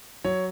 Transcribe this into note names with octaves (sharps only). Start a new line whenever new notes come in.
F#3 C#5